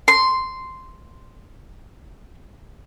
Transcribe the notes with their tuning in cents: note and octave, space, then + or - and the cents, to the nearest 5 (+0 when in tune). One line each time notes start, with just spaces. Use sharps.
C6 -5